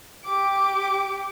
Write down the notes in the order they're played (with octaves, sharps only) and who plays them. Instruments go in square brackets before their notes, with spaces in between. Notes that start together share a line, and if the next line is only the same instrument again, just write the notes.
[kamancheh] G4 D6